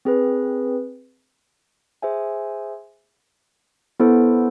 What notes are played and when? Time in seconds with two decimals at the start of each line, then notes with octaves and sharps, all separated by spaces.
0.05 C4 G#4 B4
2.02 G#4 C5 E5 G#5
4.00 B3 E4 A4 C5